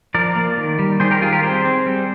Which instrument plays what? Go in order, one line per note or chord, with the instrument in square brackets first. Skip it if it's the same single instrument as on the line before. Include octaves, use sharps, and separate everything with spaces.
[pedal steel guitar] F3 A#4 D5
A#3
D#3
G3
D#3 G#4 C5
G4 A#4
G3 F4 G#4
G4 A#4
C4 G#4 C5
C4
G3